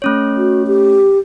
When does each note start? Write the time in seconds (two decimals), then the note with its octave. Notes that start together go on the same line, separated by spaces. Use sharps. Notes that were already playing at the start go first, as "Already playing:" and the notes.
0.02 A3 C#4 C#5
0.37 F#4
0.67 G4